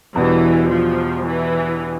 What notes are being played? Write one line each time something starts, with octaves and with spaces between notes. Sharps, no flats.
E2 B2 E3 G3 D4
F3
E3